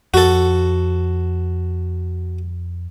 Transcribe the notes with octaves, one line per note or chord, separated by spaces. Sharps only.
F2 F#4 A4